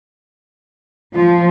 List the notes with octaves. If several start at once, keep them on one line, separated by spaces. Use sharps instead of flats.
F3